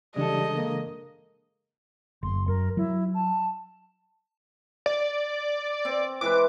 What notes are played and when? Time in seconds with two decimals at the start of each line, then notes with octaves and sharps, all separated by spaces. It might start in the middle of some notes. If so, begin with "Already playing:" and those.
0.16 C#3 E3 G3 G#3 D4 A4 D#5
0.55 A#3
2.23 F#1 C6
2.48 F#2 A#4
2.77 F#3 E4
3.14 A5
4.86 D5
5.85 C4
6.21 E3 G#3 B4 D6